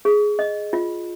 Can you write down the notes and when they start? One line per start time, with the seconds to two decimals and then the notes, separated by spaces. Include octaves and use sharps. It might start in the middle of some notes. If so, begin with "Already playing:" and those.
0.05 G#4
0.39 D#5
0.73 F4